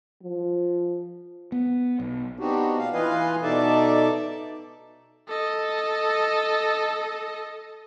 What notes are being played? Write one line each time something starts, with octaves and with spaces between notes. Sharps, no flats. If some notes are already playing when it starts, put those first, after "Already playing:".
F3
B3
B1
B3 C4 D4 D#4 F#4 G4
A#2 F5
E3 F4 B4 D#5 F5 G#5
B2 D#4 A4 D5 E5 A5
A4 D#5